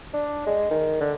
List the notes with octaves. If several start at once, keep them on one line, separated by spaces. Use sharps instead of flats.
D4
G#3
D#3
D3